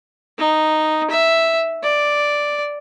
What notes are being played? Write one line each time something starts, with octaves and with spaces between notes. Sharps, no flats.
D#4
E5
D5